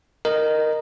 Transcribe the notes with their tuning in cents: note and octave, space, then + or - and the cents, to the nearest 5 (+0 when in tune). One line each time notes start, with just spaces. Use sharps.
A#4 +0 D#5 -15